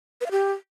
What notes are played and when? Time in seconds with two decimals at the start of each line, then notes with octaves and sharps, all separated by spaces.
0.21 B4
0.26 F5
0.31 G4